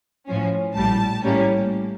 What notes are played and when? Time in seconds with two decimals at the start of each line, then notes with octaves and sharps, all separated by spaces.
0.27 A2 F3 C#4
0.75 A#1 A2 G3 A5
1.22 A2 G3 A#3 C#4